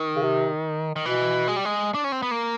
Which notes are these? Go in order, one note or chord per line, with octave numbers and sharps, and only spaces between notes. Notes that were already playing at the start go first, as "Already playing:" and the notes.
Already playing: D#3
C#3
C3
D#3
B2 E3
G#3
G3
G#3
D4
C#4
C4
B3
A#3